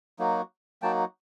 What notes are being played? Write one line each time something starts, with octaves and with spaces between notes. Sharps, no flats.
F#3 A#3 D#4 F#4
F#3 A#3 D#4 F#4 G5 A5